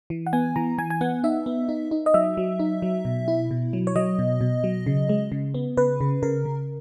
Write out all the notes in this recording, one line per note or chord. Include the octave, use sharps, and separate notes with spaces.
E3
F#5
B3 G#5
E3 A#5
E3 G#5
G#5
B3 F#5
D#4 E5
B3
D#4
D#4
D#5
F#3 E5
F#3
D#4
F#3
B2
E4
B2
F#3
C#5
F#3 D#5
B2
B2
F#3
C#3
G#3
C#3
B3
C#3 B4
C#3
C#3 A#4
C#3